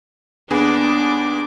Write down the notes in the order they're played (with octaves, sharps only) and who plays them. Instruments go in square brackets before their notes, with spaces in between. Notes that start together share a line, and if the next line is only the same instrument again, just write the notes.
[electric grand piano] D#2 B3 G#4 [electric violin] D4 D6